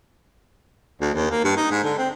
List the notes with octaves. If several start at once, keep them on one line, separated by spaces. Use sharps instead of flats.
D2
D#2
A#3
G2
D#4
G#2
D3
C4